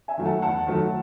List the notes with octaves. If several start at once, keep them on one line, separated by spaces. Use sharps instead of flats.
E5 G#5
D#3 F#3 A3
F#5 A5
E2 F#5 A5
D#3 F#3 A3